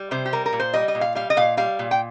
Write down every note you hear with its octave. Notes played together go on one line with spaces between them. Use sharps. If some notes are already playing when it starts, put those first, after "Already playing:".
Already playing: G3
C3 C5
G4
G3 A#4
A#4
A#2
C5
G3 D#5
D#5
A#2
F5
G3 F5
D#5
A#2 F5
G3 F5
A#2
G5